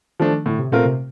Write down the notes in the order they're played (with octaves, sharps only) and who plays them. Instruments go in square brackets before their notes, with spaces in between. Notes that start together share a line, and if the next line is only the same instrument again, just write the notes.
[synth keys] D#3 [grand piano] F3 A3 D4
[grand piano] A2 [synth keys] D3
[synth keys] C3
[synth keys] A#2 [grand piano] A3 C4 F4 A#4
[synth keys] C3